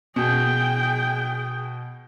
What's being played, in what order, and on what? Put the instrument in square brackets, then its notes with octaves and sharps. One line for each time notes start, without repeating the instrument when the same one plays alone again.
[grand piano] B2 [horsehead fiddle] G#4 G5